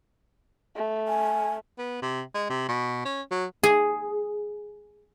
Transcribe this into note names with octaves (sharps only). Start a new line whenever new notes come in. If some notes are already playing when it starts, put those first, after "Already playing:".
A3
G#5
B3
C3
G#3
C3
B2
C#4
F#3
G#4